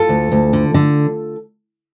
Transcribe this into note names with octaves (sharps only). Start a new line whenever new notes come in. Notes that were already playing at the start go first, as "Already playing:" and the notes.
Already playing: F4 A4
D2
D2
D3
D3